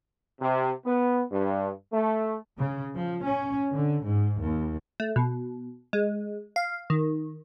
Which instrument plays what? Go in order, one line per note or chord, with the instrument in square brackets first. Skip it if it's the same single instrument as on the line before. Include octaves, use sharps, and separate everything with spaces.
[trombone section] C3
B3
G2
A3
[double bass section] C#3
F3
C#4
D3
G#2
D#2
[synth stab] A3
B2
G#3
F5
D#3